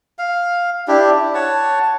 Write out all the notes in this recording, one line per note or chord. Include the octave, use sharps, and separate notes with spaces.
F5
D4 E4 G4
E4
C#5 F#5 A5